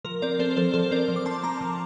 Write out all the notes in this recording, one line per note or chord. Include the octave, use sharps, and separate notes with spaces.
F3 A#4
C4 A#4 D5
C4 A4 C5
F3 A4 C5
F3 A4 C5
C4 A#4 D5
F3
D6
C4 A5 C6
C4 A#5 D6
F3